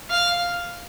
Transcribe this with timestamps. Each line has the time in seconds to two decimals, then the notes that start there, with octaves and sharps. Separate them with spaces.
0.10 F5